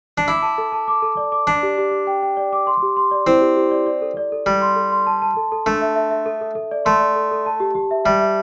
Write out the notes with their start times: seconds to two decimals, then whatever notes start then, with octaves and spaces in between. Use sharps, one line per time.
0.18 D4
0.27 E4 D6
0.42 A5
0.58 A4
0.72 A5
0.88 D6
1.02 A4
1.17 D5
1.32 D6
1.47 D4 D5
1.63 G4
1.78 G4
1.92 G4
2.07 G5
2.23 G5
2.37 D5
2.53 D6
2.67 C6
2.82 G4
2.97 C6
3.11 D5
3.26 C4 E4
3.41 G4
3.57 G4
3.71 D5
3.86 D5
4.02 A4
4.17 D5
4.32 A4
4.46 G3 D5
4.62 C6
4.76 A4
4.92 C6
5.07 A5
5.22 A5
5.37 A4
5.52 A4
5.66 A3 D4
5.81 E5
5.96 E5
6.10 E5
6.26 A4
6.41 A4
6.55 A4
6.71 D5
6.85 A3 C6
7.00 D5
7.16 A4
7.31 A4
7.46 A5
7.60 G4
7.75 G4
7.91 E5
8.05 G3 E5
8.21 E5